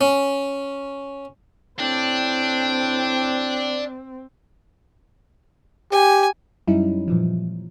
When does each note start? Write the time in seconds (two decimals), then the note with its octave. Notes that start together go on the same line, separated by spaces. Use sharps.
0.01 C#4
1.79 A2 C4 D4 E4 G5
5.92 G4 G#5
6.68 F#2 F#3 G3 C#4 D#4 E4
7.08 A#2 E3 F3